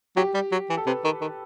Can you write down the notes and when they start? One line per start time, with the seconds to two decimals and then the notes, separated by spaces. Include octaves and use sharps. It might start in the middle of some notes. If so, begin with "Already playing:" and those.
0.17 F#3 G4
0.34 G3
0.52 F#3
0.70 E3
0.77 A4
0.87 C3 B4
1.04 D#3
1.21 D#3